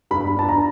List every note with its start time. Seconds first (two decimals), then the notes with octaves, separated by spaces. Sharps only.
0.11 G2 B5
0.36 D4 A5
0.49 A#5